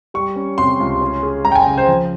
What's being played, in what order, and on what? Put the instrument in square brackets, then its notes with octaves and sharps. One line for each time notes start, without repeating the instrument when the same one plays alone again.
[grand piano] G3 [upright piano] C#6
[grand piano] C#4
[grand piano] C3 [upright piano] C6
[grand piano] C#2
C#4
G#4
[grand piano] G#3 [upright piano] A#5
[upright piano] G5
G#5
[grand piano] C#3
[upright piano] C5
[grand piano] F3